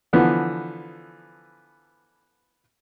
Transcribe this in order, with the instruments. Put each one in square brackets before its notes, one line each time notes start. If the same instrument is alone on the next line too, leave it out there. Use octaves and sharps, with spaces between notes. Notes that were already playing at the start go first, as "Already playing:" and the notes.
[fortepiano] D3 E3 F3 B3